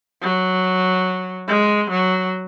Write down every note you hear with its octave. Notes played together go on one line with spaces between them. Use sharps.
F#3
G#3
F#3